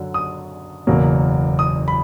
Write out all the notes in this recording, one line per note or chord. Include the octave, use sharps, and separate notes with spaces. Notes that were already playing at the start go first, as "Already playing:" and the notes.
Already playing: F#2 D3 F#3
D#6
F#1 E2 B2 F#3 A#3
D#6
B5